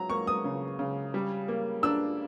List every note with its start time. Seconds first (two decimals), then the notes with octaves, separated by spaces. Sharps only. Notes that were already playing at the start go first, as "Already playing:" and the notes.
Already playing: F#3 A#5
0.10 A#3 C#6
0.27 D#6
0.44 C#3
0.79 C#3
1.14 G3
1.48 A#3
1.83 D4 E6